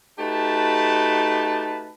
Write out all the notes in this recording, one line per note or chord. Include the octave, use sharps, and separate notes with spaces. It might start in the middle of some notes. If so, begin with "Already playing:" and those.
A3 D#4 F#4 G4 B4 A5